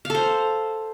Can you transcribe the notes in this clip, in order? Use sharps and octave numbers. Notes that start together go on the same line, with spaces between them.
A4 C5 F5